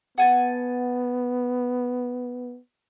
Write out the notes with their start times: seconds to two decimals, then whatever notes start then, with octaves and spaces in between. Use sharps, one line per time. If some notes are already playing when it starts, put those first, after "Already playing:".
0.18 B3 F#5 G#5 A5